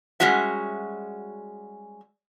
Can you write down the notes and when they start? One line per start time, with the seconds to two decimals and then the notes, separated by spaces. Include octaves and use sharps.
0.20 G3 G#3 C#4 F#4 E5